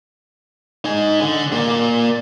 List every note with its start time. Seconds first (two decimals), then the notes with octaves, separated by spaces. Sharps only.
0.85 D#4 G#5
1.21 D3
1.53 A#3 D5